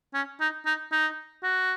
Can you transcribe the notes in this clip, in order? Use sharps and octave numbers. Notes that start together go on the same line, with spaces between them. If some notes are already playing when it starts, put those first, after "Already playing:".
C#4
D#4
D#4
D#4
F#4